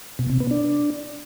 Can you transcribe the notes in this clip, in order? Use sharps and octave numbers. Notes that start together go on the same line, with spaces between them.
B2
C3
B3
D4